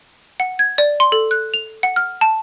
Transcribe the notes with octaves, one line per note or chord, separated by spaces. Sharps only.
F#5
G#6
D5
C6
A4
F#6
F7
F#5
F6
A5